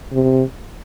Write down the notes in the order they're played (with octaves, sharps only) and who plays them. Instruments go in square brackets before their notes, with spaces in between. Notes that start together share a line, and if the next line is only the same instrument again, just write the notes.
[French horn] C3